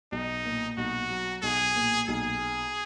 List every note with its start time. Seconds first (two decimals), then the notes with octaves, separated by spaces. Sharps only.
0.12 B1 D#4
0.45 A#2
0.77 B1 F#4
1.10 F#3
1.43 B1 G#4
1.75 A#2
2.08 B1 G#4